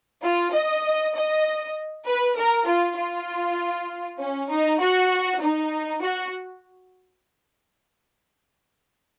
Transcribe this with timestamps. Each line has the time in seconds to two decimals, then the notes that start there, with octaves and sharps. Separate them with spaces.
0.23 F4
0.52 D#5
1.14 D#5
2.06 B4
2.36 A#4
2.67 F4
2.97 F4
4.18 C#4
4.49 D#4
4.79 F#4
5.40 D#4
6.01 F#4